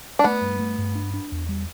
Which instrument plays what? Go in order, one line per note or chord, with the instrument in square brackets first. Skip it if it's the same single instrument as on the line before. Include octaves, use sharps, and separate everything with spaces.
[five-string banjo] D4
[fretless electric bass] A3 [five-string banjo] B3
[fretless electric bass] G2
A3
G2
D4
D4
E2
G3